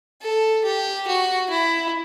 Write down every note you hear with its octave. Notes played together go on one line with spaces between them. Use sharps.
A4
G4
F#4
E4